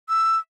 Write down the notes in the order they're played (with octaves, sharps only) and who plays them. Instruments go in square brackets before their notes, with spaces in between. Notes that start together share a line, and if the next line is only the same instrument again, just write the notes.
[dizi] E6